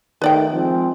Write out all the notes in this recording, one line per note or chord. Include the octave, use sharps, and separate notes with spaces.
D#3 A3 B4 D5 G5
F3 G#3 C4